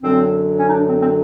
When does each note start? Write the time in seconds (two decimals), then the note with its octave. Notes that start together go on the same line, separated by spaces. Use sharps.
0.01 F#2 D3 F#3 C4
0.59 C#4
0.68 D#4
0.72 D4
0.87 C4
1.00 C4